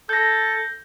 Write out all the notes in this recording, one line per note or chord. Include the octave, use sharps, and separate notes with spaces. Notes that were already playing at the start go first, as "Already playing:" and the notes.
A4 G6 A#6